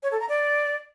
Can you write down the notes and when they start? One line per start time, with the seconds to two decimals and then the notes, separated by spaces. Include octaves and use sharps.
0.03 C#5
0.11 A4
0.20 A#5
0.29 D5